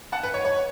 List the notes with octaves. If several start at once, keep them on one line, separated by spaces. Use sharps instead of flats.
F#5 A5
B4
C#5
C#5